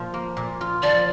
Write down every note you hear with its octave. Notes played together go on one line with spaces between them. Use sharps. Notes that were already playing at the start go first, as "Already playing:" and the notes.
Already playing: A#2 F3 F4
A#3
A#2
F4
F3 D5